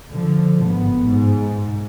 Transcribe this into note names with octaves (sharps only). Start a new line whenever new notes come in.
D3 F3
G#1 B3
G#2